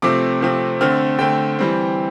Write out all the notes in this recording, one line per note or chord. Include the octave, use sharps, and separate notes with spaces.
C3 F3 A3 C4 D6
C3 F3 A3 C4
D3 A3 C4 F6
D3 A3 C4 G5
E3 G3 C4